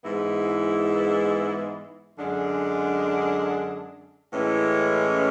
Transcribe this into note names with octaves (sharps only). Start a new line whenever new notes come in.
G#2 E3 G#3 B3 E4
F#2 D3 G#3 D4
A2 E3 G#3 C#4